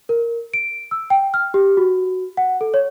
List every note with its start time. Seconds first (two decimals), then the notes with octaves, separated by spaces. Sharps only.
0.09 A#4
0.54 D7
0.91 E6
1.10 G5
1.34 F6
1.54 G4
1.77 F#4
2.37 F#5
2.61 A4
2.74 C#5